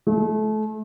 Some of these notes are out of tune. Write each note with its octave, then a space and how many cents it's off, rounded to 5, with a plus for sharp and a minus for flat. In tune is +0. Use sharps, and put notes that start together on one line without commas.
A3 -30